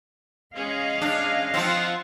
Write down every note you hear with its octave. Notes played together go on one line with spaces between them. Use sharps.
G#3 C#4 G#4 D#5 F5
D4
F3 C4 F4 F#5 A5